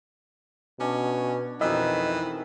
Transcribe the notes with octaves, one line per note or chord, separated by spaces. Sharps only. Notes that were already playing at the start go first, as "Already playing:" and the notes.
B2 C#4 D4
F2 B2 D#3 E3 D#5 E5